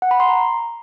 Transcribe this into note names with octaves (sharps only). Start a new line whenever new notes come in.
F#5
B5
C6
A#5